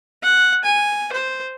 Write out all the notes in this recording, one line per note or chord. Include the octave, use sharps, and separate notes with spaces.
F#5
G#5
C5